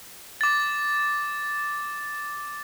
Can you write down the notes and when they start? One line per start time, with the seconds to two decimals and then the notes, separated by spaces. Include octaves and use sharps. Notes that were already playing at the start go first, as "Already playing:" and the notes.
0.41 D6 A6